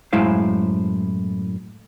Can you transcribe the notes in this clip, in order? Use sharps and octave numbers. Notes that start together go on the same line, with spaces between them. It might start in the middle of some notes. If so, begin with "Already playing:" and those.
F#2 A2 G#3 E4 C5 F5